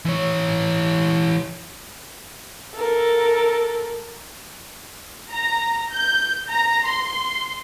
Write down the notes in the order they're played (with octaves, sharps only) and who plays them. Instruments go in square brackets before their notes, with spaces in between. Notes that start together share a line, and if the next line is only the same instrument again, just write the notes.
[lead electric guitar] E3 C#5
[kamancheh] A4 A#4
[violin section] A#5
G6
A#5
C6